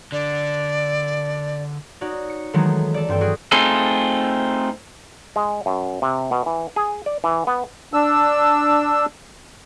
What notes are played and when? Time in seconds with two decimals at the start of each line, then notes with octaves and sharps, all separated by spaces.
0.12 D3 D5
2.01 D#4 F#4 C#5 D5
2.30 C#7
2.53 D#3 E3 F#3 G#3 A3 B3
2.94 A4 D5
3.08 G2 C4 G5
3.21 F#4 G#4 D7
3.52 A3 C4 D#4 F4 G#4 A4
5.36 G#3
5.66 F#2
6.02 C3
6.31 B2
6.46 E3
6.76 G#4
7.06 D5
7.24 E3
7.47 B3
7.93 D4 E6